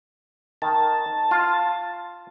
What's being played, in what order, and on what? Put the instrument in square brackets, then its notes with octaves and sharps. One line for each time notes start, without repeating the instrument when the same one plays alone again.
[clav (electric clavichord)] D#3 [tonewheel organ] A5
[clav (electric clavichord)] F4